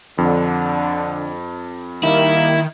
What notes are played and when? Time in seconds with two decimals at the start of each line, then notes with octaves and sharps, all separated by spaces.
0.18 F2 D3
2.03 D#3 G3 A#3 E4